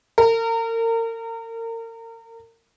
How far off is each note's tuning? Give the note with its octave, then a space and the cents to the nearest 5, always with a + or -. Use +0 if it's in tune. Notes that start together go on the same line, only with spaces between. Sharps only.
A#4 -35